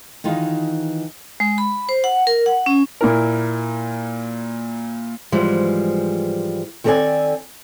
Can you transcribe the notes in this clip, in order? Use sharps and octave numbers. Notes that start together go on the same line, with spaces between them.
D#3 E3 D#4 F4 F#4 G#4
G#3
B5
C5
F#5
A#4
F#5
C#4
A#2 E4 A#4
G#2 E3 F3 G3 G#3
D#3 C4 A4 A#4 D5 G#5